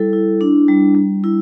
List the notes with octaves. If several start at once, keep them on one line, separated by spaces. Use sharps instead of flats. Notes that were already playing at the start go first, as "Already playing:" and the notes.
Already playing: G3 E4 A4
E4
D4
G3
G3
E4